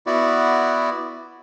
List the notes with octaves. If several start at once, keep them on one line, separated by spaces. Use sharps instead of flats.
B3 E4 F#4 D5